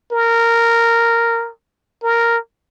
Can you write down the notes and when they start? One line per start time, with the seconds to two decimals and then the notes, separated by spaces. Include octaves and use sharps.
0.12 A#4
2.03 A#4